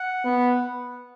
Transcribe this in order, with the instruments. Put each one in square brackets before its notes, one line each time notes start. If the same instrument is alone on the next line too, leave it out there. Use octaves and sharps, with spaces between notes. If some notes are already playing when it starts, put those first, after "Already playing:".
Already playing: [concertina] F#5
[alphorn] B3